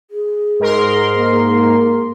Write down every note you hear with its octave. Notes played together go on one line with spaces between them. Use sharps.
G#4
G#2 A#4 C6
A#3